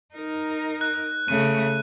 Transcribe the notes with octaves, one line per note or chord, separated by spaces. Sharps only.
D#4 A#4
F#6
C#3 A3 D#7